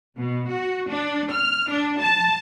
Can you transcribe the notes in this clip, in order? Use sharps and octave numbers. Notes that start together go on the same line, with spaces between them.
B2
F#4
D4
F6
D4
A5